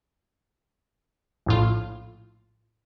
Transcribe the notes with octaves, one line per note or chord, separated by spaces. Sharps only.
A#1 A2 F4